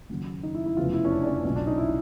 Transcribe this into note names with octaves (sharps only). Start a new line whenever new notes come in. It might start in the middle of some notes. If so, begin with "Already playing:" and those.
D#2 C#3 F#3
D#4
E4
E4
F1 E2 C#3 F3 F4
E4
C#4
D4
D4
C#4
B1 A#2 F#3 C#4
D4
D#4
E4